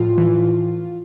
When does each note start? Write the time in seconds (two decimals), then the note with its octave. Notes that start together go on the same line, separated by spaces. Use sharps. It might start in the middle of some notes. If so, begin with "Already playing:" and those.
Already playing: A2 F3 F4
0.18 E3